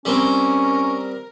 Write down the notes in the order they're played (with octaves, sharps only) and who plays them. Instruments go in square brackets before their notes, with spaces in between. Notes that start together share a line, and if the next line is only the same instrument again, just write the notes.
[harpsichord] G3 C4 [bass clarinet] C#4 [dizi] A#4